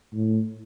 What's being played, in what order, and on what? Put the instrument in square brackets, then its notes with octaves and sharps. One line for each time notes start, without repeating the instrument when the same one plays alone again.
[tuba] A2